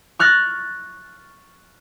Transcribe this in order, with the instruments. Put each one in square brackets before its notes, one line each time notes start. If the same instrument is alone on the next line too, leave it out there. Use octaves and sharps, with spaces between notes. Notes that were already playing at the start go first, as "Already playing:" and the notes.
[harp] C#6 F6 F#6 A6 A#6